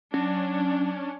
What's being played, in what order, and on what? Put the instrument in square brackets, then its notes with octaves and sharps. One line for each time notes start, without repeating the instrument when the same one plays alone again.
[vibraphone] F#3 [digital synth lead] C#4 [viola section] D4